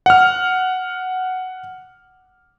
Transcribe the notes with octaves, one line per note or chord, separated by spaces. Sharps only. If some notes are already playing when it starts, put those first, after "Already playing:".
F#5 F6